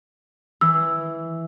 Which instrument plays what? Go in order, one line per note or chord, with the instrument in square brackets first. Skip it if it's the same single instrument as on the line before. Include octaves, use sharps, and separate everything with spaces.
[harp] E3 [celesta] E6